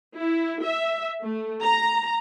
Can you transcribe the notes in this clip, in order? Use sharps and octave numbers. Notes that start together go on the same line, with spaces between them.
E4
E5
A3
A#5